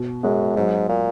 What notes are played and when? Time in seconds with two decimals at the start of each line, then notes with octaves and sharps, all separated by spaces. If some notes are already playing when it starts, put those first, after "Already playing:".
Already playing: B2
0.23 F#2 G#3
0.56 G#2 F#3
0.89 A#2